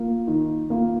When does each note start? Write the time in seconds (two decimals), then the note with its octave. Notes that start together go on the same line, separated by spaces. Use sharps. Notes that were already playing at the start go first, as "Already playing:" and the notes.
Already playing: A#3 F4
0.27 D#3
0.70 A#3 F4